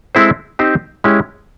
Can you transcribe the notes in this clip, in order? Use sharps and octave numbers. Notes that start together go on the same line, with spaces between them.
G#3 C4 E4 A4 C5
C4 D#4 G4 C5
G#3 C#4 E4 G4